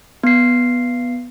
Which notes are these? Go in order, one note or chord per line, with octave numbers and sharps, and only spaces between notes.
B3 C7